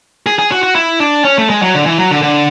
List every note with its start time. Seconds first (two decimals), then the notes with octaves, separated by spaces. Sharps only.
0.26 G#4
0.39 G#4
0.52 F#4
0.64 F#4
0.75 E4
1.00 D4
1.25 C#4
1.38 A3
1.50 G#3
1.62 F#3
1.74 D3
1.86 E3
1.98 F#3
2.11 D3
2.22 D3